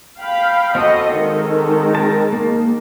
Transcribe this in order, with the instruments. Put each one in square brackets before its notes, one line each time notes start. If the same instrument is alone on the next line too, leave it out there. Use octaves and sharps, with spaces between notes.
[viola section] F5 G5 B5
[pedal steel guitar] C4 F#4 A4 [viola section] D#5
[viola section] D#3 G#3
[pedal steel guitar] A#4 A5
A#3